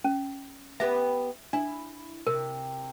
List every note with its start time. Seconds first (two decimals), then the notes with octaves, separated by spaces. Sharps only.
0.04 C#4
0.80 B3 G4 B4 E5
1.53 D4 E4
2.27 C3 A#4